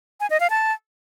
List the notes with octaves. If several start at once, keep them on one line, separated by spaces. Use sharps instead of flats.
G#5
D#5
F5
A5